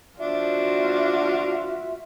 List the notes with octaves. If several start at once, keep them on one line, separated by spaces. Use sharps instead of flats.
F3 D4 F4 F#4 E5